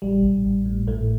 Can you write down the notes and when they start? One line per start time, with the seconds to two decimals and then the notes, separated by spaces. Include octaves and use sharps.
0.02 A1 G3
0.23 A1
0.45 A1
0.65 A2
0.87 A1 A2 A3